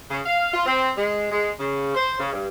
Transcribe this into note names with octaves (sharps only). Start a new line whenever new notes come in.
C#3
F5
F4
C4
G#3
G#3
C#3
C5
C#3
G2